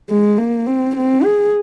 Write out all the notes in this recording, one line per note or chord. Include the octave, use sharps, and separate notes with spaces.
G#3
A#3
C4
C4
G#4